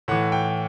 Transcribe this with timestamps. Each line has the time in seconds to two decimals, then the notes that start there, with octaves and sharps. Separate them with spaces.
0.08 A2 E3 F#5
0.32 G5